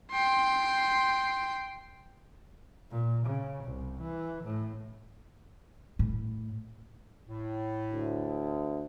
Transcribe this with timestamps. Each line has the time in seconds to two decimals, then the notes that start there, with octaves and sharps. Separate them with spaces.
0.12 G5 C6
2.91 A#2
3.26 C#3
3.64 C2
4.02 E3
4.44 A2
5.99 A2
7.28 A2
7.92 D2